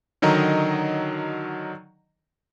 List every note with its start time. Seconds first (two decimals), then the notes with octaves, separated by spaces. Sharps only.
0.22 D3 D#3 F#3 D#5 A#5